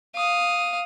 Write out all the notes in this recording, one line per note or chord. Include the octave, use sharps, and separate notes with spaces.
F5 D#6